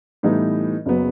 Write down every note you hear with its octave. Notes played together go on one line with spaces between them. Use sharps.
A2 E3 G3 B3 D#4
F#1 C#3 F#3 B3